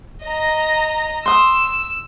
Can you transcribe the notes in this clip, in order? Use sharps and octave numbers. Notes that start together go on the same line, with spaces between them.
D#5 A#5
C6 D#6 E6